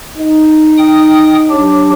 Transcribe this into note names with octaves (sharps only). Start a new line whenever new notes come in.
D#4
G5 D#6
F#3 D4 G4